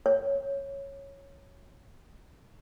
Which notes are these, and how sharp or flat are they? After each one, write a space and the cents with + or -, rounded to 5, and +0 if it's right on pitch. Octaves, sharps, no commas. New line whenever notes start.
C#5 -5